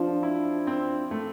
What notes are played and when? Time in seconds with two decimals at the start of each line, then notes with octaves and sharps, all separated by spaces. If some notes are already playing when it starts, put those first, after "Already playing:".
Already playing: F3 C4 D4 F4
0.23 E4
0.67 C4
1.11 A3